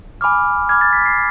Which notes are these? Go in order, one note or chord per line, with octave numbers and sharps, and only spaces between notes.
G#5 B5 D6 F6
B5 D6 F6 G#6
A6
B6
C7